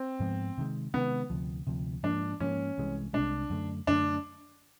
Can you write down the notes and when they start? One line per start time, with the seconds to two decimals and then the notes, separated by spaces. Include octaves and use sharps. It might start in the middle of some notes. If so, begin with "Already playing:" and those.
Already playing: C4
0.20 G#2 F3 G#3 B3
0.58 C3 D#3 G#3
0.94 C3 D#3 G#3 B3
1.30 D2 C3 F3
1.67 D2 C3 F3
2.03 G#2 F3 A#3 D4
2.40 G#2 F3 A#3 C#4
2.78 C2 C3 E3 G#3
3.13 C2 C3 E3 G#3 D4
3.50 F#2 D3 F3 A3
3.87 F#2 D3 F3 A3 D4